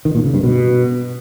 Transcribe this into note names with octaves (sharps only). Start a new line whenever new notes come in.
D#3
A#2
C#3
G2
B2